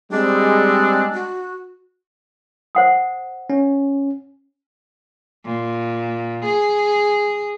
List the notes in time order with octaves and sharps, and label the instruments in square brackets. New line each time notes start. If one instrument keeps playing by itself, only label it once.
[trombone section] G3 G#3 [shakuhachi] C4 [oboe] D4
[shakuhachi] F#4
[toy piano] C5 F#5 D#6
[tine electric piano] C#4
[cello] A#2
G#4